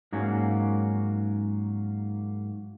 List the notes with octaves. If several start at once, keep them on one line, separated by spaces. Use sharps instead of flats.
G#2 F#3 A#3 C#4